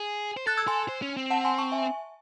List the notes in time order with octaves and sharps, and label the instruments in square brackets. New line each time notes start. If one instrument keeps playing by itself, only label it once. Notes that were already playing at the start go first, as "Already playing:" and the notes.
Already playing: [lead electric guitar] G#4
C5
[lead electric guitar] A4 [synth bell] F#6 A6
[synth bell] E6 G#6
[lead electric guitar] A4 [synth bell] G#5 C6
[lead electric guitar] C5
C#4
C4
[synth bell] F#5 A5
G#5 C6
A5 C#6
E5 G#5